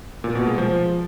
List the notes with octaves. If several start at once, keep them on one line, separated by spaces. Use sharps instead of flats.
A#2
B2
G#3
F3